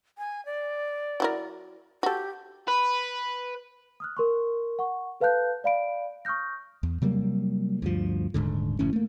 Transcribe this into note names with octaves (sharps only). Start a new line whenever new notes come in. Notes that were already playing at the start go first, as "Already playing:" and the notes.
G#5
D5
F#3 E4 A#4
F#4 G4 A4
B4
D#6 F6 F#6
A#4 C6 C#6
F#5 C#6
A4 B4 F5 A5 F#6 G6
D5 F5 B5 D7
C#6 D#6 F6 G6 A#6
E2
C3 F#3 G3 A#3
D2 G2 F3
D#1 B1 G#2 D3
F#1 A2 E3 C#4
A3 A#3